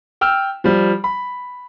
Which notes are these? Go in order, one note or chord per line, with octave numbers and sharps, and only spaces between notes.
G5 E6 F6
F3 G3
B5